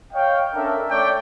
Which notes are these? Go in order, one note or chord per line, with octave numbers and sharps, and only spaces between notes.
C#5 D#5 F5 G5
C#4 D4 A4 A#4 E5
A3 C#5 D5 G5